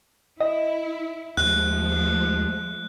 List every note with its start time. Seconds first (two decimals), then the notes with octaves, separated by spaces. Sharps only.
0.41 E4 D#5
1.37 D#2 F3 G#3 A3 F#6